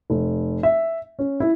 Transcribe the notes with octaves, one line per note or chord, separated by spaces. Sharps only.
F1
E5
C#4
E4